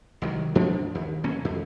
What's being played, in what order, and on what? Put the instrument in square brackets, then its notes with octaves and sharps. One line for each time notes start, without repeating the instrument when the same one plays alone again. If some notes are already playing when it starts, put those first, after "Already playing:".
[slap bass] C2 D#3 E3 F#3
D2 G2 F3 D4
D#2
D#1 B1 A#3 C#4
F2